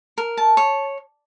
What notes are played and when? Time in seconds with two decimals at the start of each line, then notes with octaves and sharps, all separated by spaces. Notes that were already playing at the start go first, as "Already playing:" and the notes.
0.18 A#4
0.37 A5
0.57 C#5